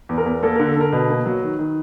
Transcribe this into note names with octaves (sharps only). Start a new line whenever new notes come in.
E2
A#4
E2
A#3 A4
D3 A#4
A4
D3 A#4
B2 B4
A#3
F#3
D#3
D#3